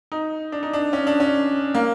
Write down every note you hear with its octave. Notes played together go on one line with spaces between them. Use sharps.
D#4
D4
D#4
D4
C#4
D4
C#4
A#3